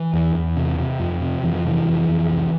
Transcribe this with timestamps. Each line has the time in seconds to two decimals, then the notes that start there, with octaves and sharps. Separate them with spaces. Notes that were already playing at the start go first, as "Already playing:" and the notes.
Already playing: E3
0.13 E2
0.35 E2
0.57 C3
0.78 C3
1.00 F2
1.21 C3
1.43 F2 E3
1.56 F3
1.65 C3 E3
1.86 F2
2.08 F2
2.31 C2